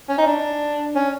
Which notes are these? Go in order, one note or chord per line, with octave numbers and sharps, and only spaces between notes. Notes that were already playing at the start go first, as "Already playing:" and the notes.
C#4
D#4
D4
C#4